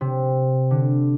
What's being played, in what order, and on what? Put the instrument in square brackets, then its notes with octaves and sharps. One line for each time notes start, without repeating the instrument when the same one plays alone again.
[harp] C3
D3